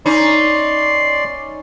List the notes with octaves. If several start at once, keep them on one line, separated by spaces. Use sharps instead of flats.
C#4 D#4 D5 C6